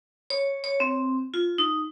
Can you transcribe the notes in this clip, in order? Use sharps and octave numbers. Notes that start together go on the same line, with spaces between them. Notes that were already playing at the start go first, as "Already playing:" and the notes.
C#5
C#5
C4
F4
D#4